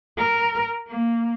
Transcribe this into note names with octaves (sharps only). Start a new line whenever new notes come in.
A#4
A#3